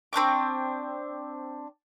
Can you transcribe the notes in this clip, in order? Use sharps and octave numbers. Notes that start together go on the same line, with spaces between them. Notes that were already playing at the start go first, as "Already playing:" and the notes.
C4 D4 C#6 D6